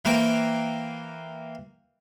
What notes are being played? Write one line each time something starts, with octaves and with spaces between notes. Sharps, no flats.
E3 A#3 C5 G5